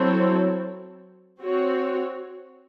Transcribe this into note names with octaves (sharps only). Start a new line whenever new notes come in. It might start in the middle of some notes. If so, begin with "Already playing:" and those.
Already playing: F#3 C4 E4 A4 C#5
C4 F#4 C#5